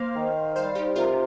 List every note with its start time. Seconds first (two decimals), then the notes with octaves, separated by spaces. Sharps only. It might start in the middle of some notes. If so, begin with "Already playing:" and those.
Already playing: A#3 C5 F5
0.15 D#3
0.55 G3 C5 F5
0.75 D#4 G4
0.96 C3 F4 A#4